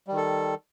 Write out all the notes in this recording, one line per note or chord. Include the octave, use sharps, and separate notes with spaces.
D#3 G3 A4